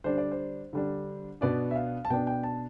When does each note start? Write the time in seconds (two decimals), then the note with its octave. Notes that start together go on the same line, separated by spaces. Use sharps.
0.04 D3 G3 D4 C5
0.18 D5
0.31 C5
0.73 D3 G3 D4
1.41 B2 B3 D4 D5
1.71 E5
1.76 F5
2.05 A5
2.10 B2 B3 D4 G5
2.27 G5
2.43 A5